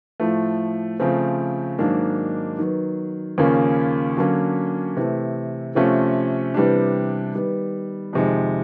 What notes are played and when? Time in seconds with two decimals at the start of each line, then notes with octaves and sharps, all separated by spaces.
0.20 A2 F3 A3
0.99 C#3 F3 A3 C4
1.79 G#2 D#3 F#3 A#3 D4
2.59 D#3 F#3 B3
3.38 D#2 C#3 F3 A#3 C#4
4.17 D3 F#3 A#3 C#4
4.97 C3 E3 A3
5.75 C3 F3 A3 C#4 F4
6.54 C3 E3 G3 B3 D4
7.35 D#3 G3 B3
8.13 F2 C3 D#3 G#3